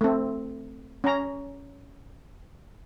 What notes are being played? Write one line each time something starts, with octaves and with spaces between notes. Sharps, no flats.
A3 C4
C#4 A#5